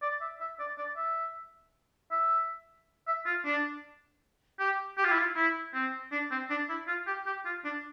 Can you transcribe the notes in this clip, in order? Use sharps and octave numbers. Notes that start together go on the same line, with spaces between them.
D5
E5
E5
D5
D5
E5
E5
E5
F4
D4
G4
G4
F4
E4
F4
E4
C4
D4
C4
D4
E4
F4
G4
G4
F4
D4